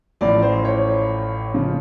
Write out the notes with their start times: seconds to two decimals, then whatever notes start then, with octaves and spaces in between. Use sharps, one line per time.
0.21 A1 A2 F3 D5
0.42 C5
0.65 C#5
1.54 C#3 F3